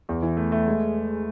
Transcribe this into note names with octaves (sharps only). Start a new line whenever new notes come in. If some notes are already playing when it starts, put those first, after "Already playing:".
E2
E3
A3
A3
G#3